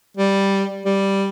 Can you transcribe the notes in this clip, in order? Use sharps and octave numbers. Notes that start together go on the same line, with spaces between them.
G3
G3